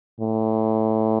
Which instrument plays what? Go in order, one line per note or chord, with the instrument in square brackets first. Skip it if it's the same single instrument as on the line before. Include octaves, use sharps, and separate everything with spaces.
[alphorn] A2